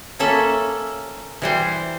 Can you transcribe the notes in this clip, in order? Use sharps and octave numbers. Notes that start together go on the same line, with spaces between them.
A#3 C#4 A4 E5
E3 G3 C5